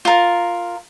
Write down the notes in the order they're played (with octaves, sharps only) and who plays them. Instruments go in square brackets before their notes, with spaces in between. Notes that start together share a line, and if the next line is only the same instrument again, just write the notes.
[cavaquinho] F4 A#4